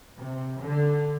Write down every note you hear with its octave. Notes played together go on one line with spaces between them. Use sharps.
C3
D3